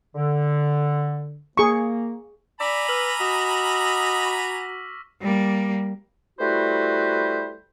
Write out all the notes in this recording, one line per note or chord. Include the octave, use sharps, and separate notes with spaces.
D3
A#3 G#4 C#6
D5 G#5 A#5 B5 D6 E6 B6
B4 E6 F6 F#7
F#4 D#5
C#6 A#6 B6
G3 A#3
G3 A3 E4 F#4 B4 C5